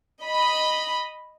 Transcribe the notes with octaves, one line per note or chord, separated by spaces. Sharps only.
D#5 B5